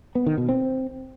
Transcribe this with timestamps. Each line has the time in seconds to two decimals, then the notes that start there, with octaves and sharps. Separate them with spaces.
0.15 B3
0.26 D#3
0.38 B2
0.49 C4